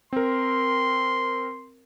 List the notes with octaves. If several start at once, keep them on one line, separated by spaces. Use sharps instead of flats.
C4 A#4 C6